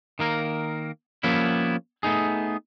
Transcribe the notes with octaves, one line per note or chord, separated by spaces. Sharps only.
D#3 A#3 A#4
F3 G3 A#3 B3 C#4 E4
A3 B3 D#4 G#4